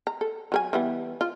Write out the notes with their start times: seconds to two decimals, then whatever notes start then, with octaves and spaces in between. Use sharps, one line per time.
0.07 A#5
0.21 A4
0.52 F#3 A#4 G#5
0.73 E3 G3 B3
1.21 F4